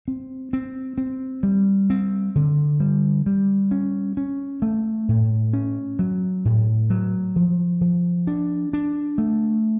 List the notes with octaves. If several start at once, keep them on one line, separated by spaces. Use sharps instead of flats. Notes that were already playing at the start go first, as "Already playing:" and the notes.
C4
C4
C4
G3
C4
D3
G3
G3
C#4
C#4
A3
A2
C#4
F#3
A2
F#3
F3
F3
D4
D4
A3